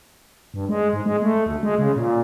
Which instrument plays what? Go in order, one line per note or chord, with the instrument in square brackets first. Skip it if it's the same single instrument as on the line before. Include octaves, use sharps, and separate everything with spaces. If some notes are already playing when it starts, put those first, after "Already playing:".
[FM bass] G2
G#3
G#2
G#3
A3
D2
G#3
C#3
A#2